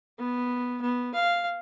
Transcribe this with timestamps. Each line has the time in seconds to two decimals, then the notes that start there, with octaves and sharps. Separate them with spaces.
0.18 B3
0.81 B3
1.14 F5